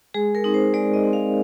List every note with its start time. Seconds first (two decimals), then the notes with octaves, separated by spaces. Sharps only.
0.14 G#3 G#4
0.35 A#4
0.44 C4 D#4
0.54 C5
0.74 G#3 D5
0.94 D#5
1.04 C4 D#4
1.13 F5